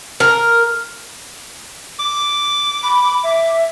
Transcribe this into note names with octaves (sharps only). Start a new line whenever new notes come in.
A#4
D6
B5
E5